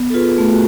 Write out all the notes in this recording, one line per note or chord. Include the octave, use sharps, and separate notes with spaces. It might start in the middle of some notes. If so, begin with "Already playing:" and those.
Already playing: B3
A4
F4 G#4 B4
A3
F#4